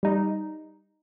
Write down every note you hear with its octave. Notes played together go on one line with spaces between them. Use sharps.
G3 D#4